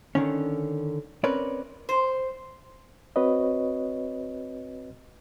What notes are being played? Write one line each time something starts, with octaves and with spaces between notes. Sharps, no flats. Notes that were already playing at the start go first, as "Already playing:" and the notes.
D3 D#3 C#4
C4 C#4 A#4 B4 C#5 D5
C5
C4 F#4 B4 C#5 D#5